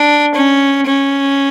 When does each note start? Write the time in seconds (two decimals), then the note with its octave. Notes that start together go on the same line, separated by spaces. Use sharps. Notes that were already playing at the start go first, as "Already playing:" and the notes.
Already playing: D4
0.35 C#4
0.87 C#4